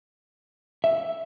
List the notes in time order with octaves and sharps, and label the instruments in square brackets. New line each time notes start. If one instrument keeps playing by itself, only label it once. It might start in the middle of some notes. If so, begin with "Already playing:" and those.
[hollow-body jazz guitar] E5